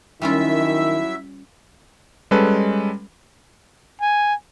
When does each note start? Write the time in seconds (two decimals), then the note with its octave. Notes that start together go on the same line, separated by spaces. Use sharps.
0.22 F#2 D#3 G3 C#4 E4 F4 E5 E6
2.31 G3 G#3 C#4 A4 B4
4.01 G#5